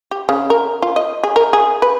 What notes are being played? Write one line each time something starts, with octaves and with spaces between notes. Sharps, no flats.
G4
C#3
A#4
F4
D#5
G#4
A#4
G#4
B4